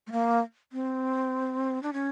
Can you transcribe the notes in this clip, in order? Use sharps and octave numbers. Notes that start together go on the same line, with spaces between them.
A3
A#3
C4
D4
C#4